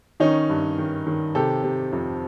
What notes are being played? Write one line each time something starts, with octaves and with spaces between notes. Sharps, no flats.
D#3 C#4 D#4
G2
D#3
D#3
C3 G4 A4
C3
F2